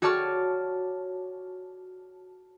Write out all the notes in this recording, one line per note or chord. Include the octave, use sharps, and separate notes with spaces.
F#4 C#5 D5 A5 C#6 F6